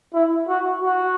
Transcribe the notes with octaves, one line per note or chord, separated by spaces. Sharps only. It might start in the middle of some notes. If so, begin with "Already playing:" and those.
E4
F#4
F#4